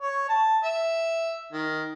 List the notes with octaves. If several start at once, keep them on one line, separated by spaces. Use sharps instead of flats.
C#5
A5
E5
D#3